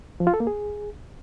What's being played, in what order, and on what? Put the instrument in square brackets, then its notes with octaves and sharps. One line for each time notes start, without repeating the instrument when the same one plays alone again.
[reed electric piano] F3
F4
A4
A#3
G#4